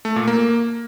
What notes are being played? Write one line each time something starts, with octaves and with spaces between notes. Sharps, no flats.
A3
A#2
A#3